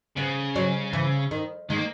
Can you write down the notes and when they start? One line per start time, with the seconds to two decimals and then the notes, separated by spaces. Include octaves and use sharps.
0.16 C#3 B3
0.56 F#3
0.93 E3
1.31 D#3
1.70 D#3 G#3
1.77 A#3